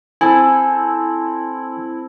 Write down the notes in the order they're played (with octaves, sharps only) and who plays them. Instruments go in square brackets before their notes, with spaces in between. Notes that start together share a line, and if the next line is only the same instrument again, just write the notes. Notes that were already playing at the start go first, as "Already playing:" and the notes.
[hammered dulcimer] C4 A4 [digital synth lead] E4 [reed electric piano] G#5